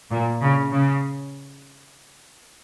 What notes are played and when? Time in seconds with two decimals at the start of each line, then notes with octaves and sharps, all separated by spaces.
0.10 A#2
0.41 C#3
0.72 C#3